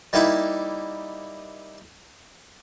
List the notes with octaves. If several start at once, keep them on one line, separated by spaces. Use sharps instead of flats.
G3 A#3 D#4 E4